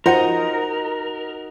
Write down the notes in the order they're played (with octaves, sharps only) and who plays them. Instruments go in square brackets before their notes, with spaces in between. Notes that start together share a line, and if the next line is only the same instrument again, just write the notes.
[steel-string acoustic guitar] D#4 F#4 D#5 [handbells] F4 C5 F#5 [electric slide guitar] A#4